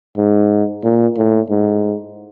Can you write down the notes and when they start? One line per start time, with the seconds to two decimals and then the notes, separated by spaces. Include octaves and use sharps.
0.17 G#2
0.84 A#2
1.17 A2
1.50 G#2